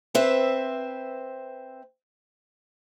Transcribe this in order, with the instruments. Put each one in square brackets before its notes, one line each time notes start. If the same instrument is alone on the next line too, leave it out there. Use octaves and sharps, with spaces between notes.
[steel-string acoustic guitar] C4 B4 C5 E5